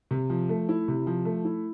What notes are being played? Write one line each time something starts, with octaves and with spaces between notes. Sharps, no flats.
C3
F3
A3
E4
C3
F3
A3
E4